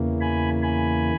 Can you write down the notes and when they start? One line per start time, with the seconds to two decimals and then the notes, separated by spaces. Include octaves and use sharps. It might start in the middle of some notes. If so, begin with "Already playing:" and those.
Already playing: E2 C#3 E3 A#3
0.21 G#5 B5
0.63 G#5 B5